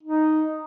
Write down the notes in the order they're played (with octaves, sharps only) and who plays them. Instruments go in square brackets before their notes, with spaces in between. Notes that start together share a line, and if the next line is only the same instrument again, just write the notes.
[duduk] D#4